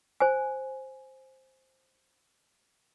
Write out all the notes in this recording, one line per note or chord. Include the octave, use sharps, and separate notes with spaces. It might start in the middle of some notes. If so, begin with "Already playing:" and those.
C5 G#5